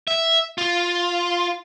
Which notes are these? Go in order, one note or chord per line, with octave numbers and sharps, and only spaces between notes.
E5
F4